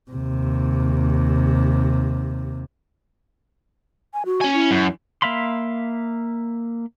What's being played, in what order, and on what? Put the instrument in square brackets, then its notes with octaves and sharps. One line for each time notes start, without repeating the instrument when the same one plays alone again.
[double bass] D#2 C3
[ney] G#5
F#4
[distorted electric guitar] C#4 G#5
[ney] E4
[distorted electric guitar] F#2
[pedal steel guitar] A#3 E5 F5 B5 C6